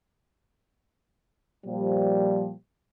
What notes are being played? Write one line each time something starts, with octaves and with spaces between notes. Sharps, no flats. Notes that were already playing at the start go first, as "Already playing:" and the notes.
A#2 F3 G3